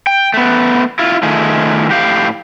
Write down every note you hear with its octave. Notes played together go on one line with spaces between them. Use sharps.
G5
A3 B3
E4 F4
D#3 A3 F4 G#4
A2 G4 F5